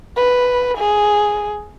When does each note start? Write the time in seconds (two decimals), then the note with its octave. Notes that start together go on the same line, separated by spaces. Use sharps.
0.17 B4
0.78 G#4